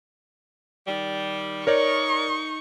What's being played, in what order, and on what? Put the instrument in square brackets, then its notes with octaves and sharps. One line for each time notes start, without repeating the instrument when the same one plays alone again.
[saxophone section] D#3 G3
[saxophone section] D#4 [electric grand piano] A#4 C#5 D5 [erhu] C#6